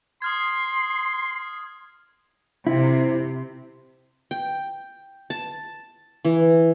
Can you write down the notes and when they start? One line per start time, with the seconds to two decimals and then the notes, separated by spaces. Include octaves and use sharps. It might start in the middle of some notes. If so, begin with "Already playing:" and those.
0.22 C6 D#6 F6 G#6
2.67 C3 E4
4.31 G5
5.30 A5
6.25 E3